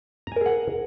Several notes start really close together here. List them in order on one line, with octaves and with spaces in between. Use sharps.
A#5 G#5 A#4 G#4 F#5